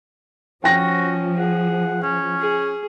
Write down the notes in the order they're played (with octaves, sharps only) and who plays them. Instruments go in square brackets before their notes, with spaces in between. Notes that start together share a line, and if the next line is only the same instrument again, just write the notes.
[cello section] F3 [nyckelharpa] C#4 [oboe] F#4 [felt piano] G5 A#6
[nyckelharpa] G#4 [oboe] F#5
[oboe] C#4
[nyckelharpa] G#4